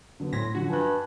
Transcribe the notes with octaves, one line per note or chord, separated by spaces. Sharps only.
D3 F#3 B3
A2 C6 G#6 A#6 B6
D3 F3 F#3 F#4
G2 G#5 F#6